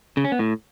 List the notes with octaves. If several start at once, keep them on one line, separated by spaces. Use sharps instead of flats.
C#3
C#4
B3
A2